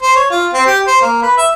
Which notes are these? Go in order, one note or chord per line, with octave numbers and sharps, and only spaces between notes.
C5
C#5
F4
C4
G4
C5
A#3
B4
E5